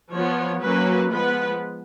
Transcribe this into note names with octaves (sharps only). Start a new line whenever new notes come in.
F3 B3 C#5
F#3 A#3 C#4 B4
F3 G#3 B3 B4